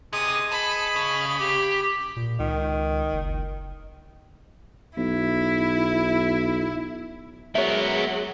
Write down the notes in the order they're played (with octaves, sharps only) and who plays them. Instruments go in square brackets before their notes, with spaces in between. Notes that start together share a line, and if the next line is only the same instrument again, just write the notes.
[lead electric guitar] C3 [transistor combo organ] G#4 D#5 [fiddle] D#6
[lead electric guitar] A4 [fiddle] B5
[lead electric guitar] C#3
[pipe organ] G4
[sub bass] A#2
[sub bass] C#2 [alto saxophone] D#3
[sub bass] F#1
[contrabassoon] B1 [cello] E4
[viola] F#3 G#3 [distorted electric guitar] B3 A#4 [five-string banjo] C#5 E5